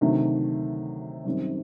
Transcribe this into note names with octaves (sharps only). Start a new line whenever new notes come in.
D2 C3 D#3 F#3 A3
F#2 D#3 G3 C4